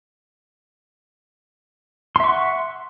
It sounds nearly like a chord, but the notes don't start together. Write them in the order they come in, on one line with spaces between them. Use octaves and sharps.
C6 E5 C#6 F#5